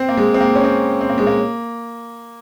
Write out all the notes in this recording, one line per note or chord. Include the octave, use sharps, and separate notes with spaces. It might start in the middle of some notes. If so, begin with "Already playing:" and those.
Already playing: C4
A#3
G#3
C4
A#3
C#4
C4
C4
A#3
G#3
A#3